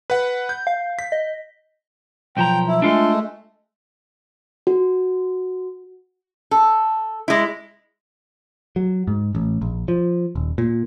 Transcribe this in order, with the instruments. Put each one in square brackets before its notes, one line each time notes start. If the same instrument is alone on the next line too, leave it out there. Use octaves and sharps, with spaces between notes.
[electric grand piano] B4 F#5
G6
[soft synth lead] F5
[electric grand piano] B6
[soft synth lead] D#5
[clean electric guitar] B1 F3 A#5 [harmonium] G5
[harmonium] E4
[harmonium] G#3 A3 [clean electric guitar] D4 F4 A4
[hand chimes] F#4
[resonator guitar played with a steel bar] A4
G#3 E4
[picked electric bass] F#3
G#2
A1
A#1
F3
D#1
A#2